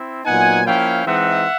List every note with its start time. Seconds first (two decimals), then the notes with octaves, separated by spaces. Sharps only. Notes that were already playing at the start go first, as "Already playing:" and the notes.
Already playing: C4 E4
0.25 A#2 F#3 B3 D#4 F#5 G#5
0.65 F3 A#3 C#4 E4 F5 G5
1.06 E3 G#3 C4 D#4 E5 F#5